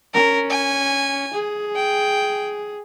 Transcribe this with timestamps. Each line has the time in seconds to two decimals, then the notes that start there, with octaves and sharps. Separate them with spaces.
0.14 C#4 A#4
0.50 G#5
1.34 G#4
1.76 G5